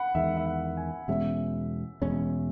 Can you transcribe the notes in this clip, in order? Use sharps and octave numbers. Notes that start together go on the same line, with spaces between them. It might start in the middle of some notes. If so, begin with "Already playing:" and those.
Already playing: F#5 B5
E2 D#3 G#3 E5
E5
F#5
G#5
E2 B2 G#3 C#4 E5
E2 B2 G#3 C#4